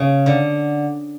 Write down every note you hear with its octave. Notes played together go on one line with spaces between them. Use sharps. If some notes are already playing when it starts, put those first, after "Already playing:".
Already playing: C#3
D3